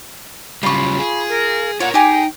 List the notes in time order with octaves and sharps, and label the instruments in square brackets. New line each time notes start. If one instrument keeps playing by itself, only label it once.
[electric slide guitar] C#3 F#3 G3 [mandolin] F4 C#6 [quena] B5
[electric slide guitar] G#4
[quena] A#4
[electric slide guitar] F4 A#4 A#5 [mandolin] C#5 [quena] F#5
[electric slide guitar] D#4 [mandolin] G4 G#4 [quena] G5